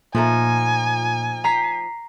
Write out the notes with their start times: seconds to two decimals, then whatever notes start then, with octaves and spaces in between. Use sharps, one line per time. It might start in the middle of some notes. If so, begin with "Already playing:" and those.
0.15 A#2 F3 A3 D#4 G#5
1.44 A#5 B6 C7